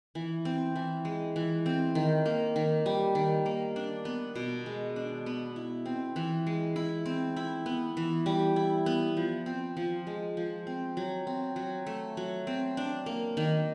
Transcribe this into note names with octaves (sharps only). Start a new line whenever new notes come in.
E3
C4
E3
G#3
E3
C4
D#3
A#3
D#3
G3
D#3
A#3
D4
B3
B2
G#3
D4
B3
E4
C4
E3
G#3
E4
C4
E4
B3
E3
G3
E4
B3
F3
C4
F3
G#3
F3
C4
F#3
C4
F#3
A3
F#3
C4
D4
A#3
D#3